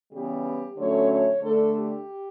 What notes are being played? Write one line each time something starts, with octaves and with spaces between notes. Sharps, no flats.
C#3 E3 G3 B3 G4
D3 F#3 A3 C#4 C#5
C#5
D3 A3 D4 A4
G4